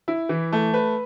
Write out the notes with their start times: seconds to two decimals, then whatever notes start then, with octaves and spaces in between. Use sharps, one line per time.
0.08 E4
0.29 E3
0.52 A3
0.74 B4